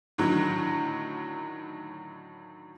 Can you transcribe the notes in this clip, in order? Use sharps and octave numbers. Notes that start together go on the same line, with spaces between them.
A2 D3 D#3 F#3